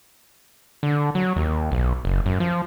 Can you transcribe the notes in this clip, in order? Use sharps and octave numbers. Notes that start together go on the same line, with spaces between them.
D3
F#3
D#2
B1
F#1
F#2
F3